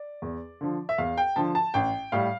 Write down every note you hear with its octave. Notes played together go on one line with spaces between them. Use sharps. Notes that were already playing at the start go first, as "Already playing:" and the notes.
Already playing: D5
E2
D3 F3
E5
E2 F5
G5
D3 F3 A5
A5
A1 G5
A2 G3 F5